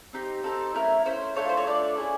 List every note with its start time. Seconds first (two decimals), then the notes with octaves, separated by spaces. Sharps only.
0.13 C4 D#4 G4
0.43 C4 D#4 G4 A4
0.74 A3 C#4 E4 A#4
1.05 A3 C#4 E4 C5
1.36 A3 D4 F4 A4 C#5
1.49 C5
1.57 C#5
1.66 A3 D4 F4 A4 D5
1.97 C#4 E4 G#4